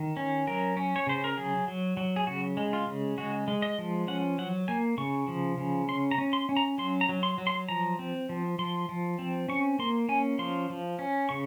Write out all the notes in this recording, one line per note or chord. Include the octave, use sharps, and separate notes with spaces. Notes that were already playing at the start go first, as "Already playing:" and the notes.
Already playing: D#3
C#4
F#3 A#4
C#4
C#5
C#3 C5
A#4
F#3 G#4
F#3
F#3
G#4
C#3 F#4
G#3
F4
C#3
G#3 F#4
G#3
D#5
F3
C#4 F#5
F#3 F#5
A#3 G#5
C#3 C#6
F3
C#3
C#4 C6
A#5
C#4
C6
C#4
A#5
F#3 C6
A#5
F#3
C6
F#3
C6
F3 A#5
C4
F3
F3 C6
F3
C4
C#4 C#6
A#3 C6
C#4 G#5
F3 C6
F3
C#4
C#3 C#6